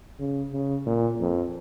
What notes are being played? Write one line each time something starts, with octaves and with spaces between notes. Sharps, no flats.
C#3
C#3
A#2
F2